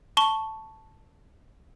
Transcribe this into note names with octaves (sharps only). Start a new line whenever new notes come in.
A5 C#6 G7